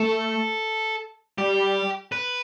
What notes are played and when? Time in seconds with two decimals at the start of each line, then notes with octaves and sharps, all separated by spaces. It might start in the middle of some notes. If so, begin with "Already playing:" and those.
Already playing: A3 A4
1.38 G3 G4
2.12 B4